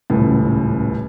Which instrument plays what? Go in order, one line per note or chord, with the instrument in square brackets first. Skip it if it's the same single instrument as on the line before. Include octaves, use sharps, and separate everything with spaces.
[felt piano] D#1 C#2 A2